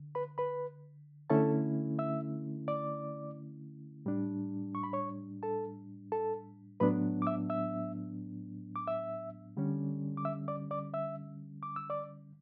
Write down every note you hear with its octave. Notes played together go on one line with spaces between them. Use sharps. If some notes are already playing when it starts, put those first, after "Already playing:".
Already playing: D3
B4 B5
B4 B5
D3 A3 C#4 E4 A4 A5
E5 E6
D5 D6
A2 G3 D4
C#6
B5
C#5 C#6
A4 A5
A4 A5
A2 F#3 B3 D4 B4 B5
D6
E5 E6
E5 E6
D6
E5 E6
D3 G3 C#4
D6
E5 E6
D5 D6
D5 D6
E5 E6
D6
E6
D5 D6